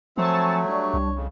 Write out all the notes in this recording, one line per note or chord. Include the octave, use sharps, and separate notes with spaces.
F3 F#3 A3 C4 G#5 A5 C#6
G3 D4 C#5
C2
F2 C#3